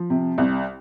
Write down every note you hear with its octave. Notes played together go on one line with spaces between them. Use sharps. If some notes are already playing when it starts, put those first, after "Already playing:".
Already playing: F3
C3
C2